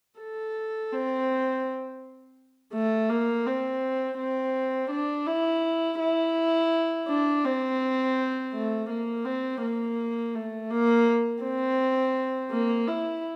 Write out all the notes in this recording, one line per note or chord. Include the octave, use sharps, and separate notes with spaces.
A4
C4
A3
A#3
C4
C4
D4
E4
E4
D4
C4
A3
A#3
C4
A#3
A3
A#3
C4
A#3
E4